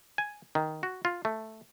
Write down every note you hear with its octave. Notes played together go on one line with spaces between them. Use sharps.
G#5
D#3
F#4
F4
A3